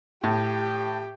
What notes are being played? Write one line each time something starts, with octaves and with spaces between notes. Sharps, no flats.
A2 G4